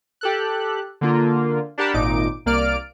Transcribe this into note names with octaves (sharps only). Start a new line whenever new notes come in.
G4 A4 F#6
D3 A#3 F4
D4 G4 A#4 F#5 A5 B5
G#1 A#2 D#4 D6 D7
C2 A#3 D5 F6 D7